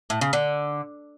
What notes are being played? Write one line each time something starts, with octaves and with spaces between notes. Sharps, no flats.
A2
C#3
D3